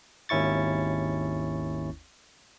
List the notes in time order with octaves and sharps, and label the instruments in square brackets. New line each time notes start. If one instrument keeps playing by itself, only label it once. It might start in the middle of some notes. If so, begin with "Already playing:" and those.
[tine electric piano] G#1 D#2 C#4 E4 C#6 A6